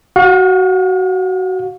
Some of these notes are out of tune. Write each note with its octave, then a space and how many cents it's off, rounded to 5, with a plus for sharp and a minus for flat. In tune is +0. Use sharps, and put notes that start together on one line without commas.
F#4 +15 F5 +45